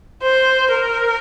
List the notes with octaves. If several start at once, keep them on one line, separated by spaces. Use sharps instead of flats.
C5
A#4